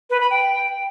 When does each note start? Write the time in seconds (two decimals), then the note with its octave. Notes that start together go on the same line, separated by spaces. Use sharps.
0.10 B4
0.20 B5
0.31 G5